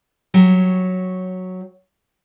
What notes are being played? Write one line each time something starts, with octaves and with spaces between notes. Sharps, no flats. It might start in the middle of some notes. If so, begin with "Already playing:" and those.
F#3 G4 C#5